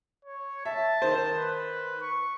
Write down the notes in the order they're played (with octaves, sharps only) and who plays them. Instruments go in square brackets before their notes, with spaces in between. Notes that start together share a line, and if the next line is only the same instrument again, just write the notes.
[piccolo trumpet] C#5
[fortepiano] E5 [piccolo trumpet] A5
[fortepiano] D#3 C5
[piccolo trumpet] B4
C#6